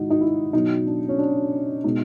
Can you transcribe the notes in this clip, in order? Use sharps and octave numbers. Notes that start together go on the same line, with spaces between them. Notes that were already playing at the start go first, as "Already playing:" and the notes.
Already playing: G#2 D#3 G#3 D#4 E4 F#4
D#4
E4
B2 F#3 D#4
D4
C#4
D4
B2 G#3 D#4